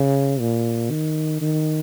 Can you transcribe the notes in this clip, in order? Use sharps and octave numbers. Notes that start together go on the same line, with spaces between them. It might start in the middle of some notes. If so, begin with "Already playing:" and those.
Already playing: C#3
A#2
D#3
D#3